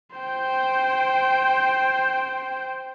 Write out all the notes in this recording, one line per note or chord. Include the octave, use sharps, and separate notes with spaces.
C5 G5